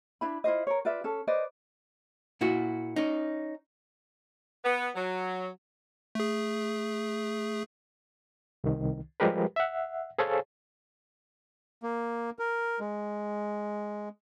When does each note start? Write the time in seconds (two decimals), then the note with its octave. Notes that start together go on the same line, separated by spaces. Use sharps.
0.21 D4 E4 B5
0.44 E4 F4 C5 D#5
0.67 A#4 C#5
0.85 F4 B4 D5 E5
1.04 C#4 A4
1.27 B4 C5 D5 D#5
2.41 A#2 E4 F#4
2.96 C#4 D#4
4.64 B3
4.95 F#3
6.15 A3 G#4
8.64 C2 D#3
9.20 F3 G3 G#3 G4 A#4 B4
9.56 E5 F#5
10.18 G#4 A4 C5 C#5 F5 G#5
11.83 A#3
12.39 A#4
12.80 G#3